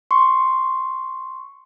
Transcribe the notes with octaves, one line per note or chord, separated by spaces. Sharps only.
C6 C#6